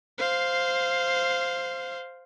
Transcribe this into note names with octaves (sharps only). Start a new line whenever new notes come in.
C5 F5